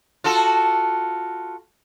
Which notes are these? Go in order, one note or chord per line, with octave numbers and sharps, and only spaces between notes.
F4 F#4 A4